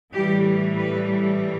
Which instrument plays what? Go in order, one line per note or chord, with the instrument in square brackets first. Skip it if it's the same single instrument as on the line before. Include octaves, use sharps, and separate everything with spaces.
[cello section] A2 E3 G3 G4
B4